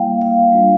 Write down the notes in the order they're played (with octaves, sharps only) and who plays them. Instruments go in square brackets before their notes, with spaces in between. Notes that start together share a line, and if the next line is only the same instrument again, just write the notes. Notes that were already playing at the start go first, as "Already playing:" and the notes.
Already playing: [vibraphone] G3 A#3 E4 F5 G5
F5
G3 D4 F4